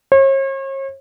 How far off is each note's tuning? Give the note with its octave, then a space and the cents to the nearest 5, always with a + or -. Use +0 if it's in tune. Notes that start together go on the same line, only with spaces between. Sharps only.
C#5 -40